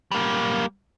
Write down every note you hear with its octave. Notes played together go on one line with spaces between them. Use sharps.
G3 A#3